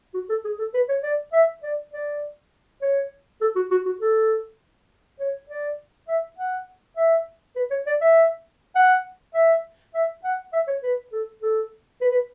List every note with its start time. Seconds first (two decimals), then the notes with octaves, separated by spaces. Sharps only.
0.14 F#4
0.29 A4
0.44 G#4
0.59 A4
0.74 B4
0.89 C#5
1.03 D5
1.33 E5
1.63 D5
1.93 D5
2.82 C#5
3.41 A4
3.56 F#4
3.71 F#4
3.86 F#4
4.00 A4
5.20 C#5
5.49 D5
6.08 E5
6.38 F#5
6.97 E5
7.56 B4
7.71 C#5
7.87 D5
8.01 E5
8.76 F#5
9.34 E5
9.94 E5
10.24 F#5
10.53 E5
10.67 C#5
10.83 B4
11.12 A4
11.42 A4
12.01 B4
12.11 B4